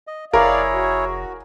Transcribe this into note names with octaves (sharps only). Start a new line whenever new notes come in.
D#5
F1 E4 G#4 A#4 C#5 D5 F5
F#4